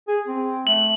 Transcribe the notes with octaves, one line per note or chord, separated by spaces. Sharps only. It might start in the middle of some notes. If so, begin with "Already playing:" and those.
G#4
C4
A3 F#7